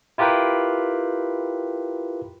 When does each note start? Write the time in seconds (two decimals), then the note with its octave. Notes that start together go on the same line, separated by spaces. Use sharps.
0.18 E4 F4 G4 A#4 B4 G5